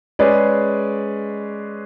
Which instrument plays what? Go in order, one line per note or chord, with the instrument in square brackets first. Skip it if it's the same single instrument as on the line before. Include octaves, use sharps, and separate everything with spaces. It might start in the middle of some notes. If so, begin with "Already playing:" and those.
[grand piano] G#3 C#4 G#4 B4 D5